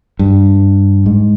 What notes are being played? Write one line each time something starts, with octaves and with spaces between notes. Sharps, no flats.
G2
G#2